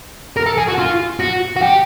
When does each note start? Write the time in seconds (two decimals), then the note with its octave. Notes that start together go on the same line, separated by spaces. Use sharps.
0.37 A#4
0.46 A4
0.58 G#4
0.68 F#4
0.78 F4
1.20 F#4
1.56 F#4
1.62 G4